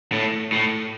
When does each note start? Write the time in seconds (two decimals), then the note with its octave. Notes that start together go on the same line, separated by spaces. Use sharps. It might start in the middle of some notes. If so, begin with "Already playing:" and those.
0.12 A2
0.52 A2